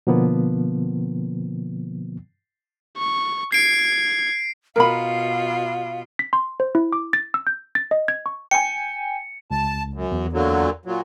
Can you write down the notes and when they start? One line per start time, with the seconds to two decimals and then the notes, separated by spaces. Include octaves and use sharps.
0.07 B2 D3 F3 A#3 B3
2.98 C#6
3.52 G#6 C7 D7
4.76 B2 F4 A#4 F5 B5
6.19 B6
6.33 C6
6.60 C5
6.75 E4
6.93 D6
7.13 A6
7.34 E6
7.47 G6
7.75 A6
7.91 D#5
8.08 G#6
8.26 C#6
8.51 G5 G#5 C#7
9.51 C#2 A5
9.94 F#2
10.12 E2
10.33 A#2 D3 F#3
10.85 A#2 F#3